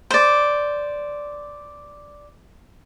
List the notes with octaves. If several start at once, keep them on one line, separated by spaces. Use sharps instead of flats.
C5 D5